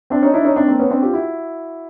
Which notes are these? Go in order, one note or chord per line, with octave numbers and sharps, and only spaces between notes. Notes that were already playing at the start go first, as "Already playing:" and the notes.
C4 D4
C#4 D#4
D4 E4
C#4 D#4
C4 D4
A#3 C4
B3 C#4
C4 D4
F4 G4
E4 F#4